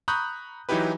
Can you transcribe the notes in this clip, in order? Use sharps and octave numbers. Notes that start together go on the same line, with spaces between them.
A#5 B5 C#6 D#6 F#6 G6
E3 F#3 D#4 E4 G4 B4